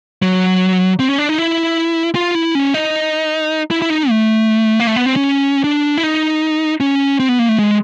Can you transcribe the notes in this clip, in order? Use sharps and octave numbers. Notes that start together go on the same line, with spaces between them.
F#3
C4
C#4
D4
D#4
E4
F4
E4
C#4
D#4
E4
E4
D#4
A3
A#3
A3
B3
C4
C#4
D4
E4
D#4
C#4
C4
B3
A#3
A3
G#3